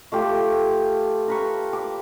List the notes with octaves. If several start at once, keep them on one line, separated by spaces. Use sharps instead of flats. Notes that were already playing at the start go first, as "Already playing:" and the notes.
A3 F4 G4
A#4 B4 C#6
D6